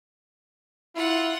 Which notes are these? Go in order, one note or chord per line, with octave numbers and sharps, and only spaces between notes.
E4 F4 F#5